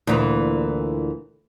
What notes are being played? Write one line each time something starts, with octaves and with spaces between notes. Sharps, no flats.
D2 A#2 E3